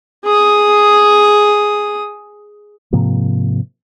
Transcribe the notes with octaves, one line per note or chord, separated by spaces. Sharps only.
G#4 D#6
G#2 C3 F3 A#3